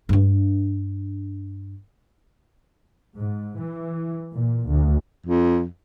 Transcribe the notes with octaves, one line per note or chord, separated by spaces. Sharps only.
G2 D4
G#2
E3
A#2
D2
F2